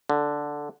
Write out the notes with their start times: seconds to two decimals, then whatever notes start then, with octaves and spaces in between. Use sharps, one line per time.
0.10 D3